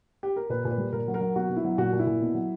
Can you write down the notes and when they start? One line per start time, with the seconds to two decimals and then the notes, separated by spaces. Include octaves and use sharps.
0.23 G4
0.36 A#4
0.50 A#2 B4
0.65 A#2
0.71 B4
0.78 G3
0.93 A#2 A#4
1.08 F#3
1.14 A#4
1.21 F#3
1.36 B2 F#4
1.49 B2
1.57 E4
1.64 F#3
1.78 A#2 F#4
1.93 A#2
1.99 E4
2.07 A#2
2.21 B2
2.34 F#3